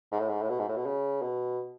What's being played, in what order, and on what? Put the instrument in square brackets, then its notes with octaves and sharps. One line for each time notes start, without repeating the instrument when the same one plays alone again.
[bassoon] G#2
A2
G#2
A2
B2
G#2
A2
B2
C#3
B2